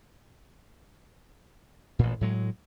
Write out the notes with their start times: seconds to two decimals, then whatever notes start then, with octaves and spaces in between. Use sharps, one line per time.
1.99 A1 A#2
2.21 A2 F#3 G#3